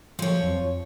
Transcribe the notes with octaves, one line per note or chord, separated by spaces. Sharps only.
F3 F#3 C#5
F2